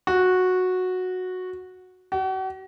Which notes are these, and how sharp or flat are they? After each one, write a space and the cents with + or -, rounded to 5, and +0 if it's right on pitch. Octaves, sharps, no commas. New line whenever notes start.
F#4 -10
F#4 +40